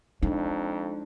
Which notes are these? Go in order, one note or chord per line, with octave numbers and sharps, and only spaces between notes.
F2 G#3 D4 D#4